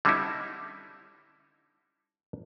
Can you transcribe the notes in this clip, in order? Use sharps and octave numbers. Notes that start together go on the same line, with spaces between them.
D3 G3 C4 C#4 D#4 E4